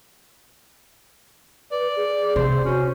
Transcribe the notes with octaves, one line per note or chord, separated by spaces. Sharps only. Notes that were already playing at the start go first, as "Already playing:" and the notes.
B4 D5
G#4
C3 C5
C#4 F#4